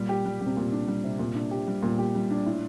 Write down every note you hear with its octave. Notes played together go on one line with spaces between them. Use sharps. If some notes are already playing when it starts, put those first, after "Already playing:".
Already playing: A#2 G3
G4
G3
G3
C3
A#2 G4
D4
G3
C3
A#2 G3
D4
G4
G3
A#2 G3
G4
G3
D4
A2